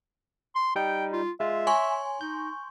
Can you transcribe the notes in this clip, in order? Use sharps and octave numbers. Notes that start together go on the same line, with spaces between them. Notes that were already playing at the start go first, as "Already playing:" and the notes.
C6
G3 D#4 G5
F4
G#3 F4 E5
C#5 G#5 C6 C#6
D#4 G6